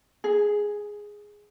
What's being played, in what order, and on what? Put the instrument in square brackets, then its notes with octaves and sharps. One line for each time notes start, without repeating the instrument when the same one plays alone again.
[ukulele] G#4